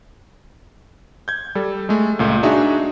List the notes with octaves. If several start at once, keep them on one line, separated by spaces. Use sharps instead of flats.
G6 G#6
G3 A4
G#3 A3
C#2 A#2 A3
D4 D#4 F#4 G#4 E5